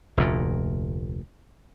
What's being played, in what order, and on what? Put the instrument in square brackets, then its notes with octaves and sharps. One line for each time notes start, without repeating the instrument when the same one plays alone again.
[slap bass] F1 D2 A#2